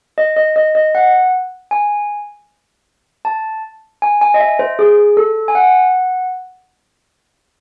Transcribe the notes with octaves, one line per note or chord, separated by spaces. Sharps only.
D#5
D#5
D#5
D#5
F#5
G#5
A5
G#5
G#5
D#5
E5
C5
G#4
A4
G#5
F#5